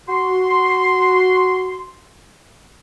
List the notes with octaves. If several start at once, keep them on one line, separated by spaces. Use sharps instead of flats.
F#4 C6